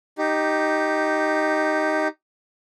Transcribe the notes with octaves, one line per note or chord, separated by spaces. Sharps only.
D#4 G4